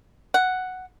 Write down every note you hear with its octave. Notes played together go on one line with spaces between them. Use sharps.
F#5